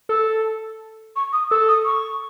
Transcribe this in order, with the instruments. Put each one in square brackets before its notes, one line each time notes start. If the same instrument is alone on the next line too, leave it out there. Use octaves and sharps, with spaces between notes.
[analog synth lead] A4 [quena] E6
[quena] C#6
D#6
[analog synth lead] A4 [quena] E6
[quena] D#6
C#6